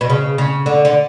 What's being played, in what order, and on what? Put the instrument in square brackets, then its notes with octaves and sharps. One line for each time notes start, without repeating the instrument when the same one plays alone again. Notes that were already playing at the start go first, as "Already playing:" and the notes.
[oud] B2
C#3
C#3
D3
D3